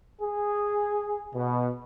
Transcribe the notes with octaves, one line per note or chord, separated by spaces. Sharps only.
G#4
B2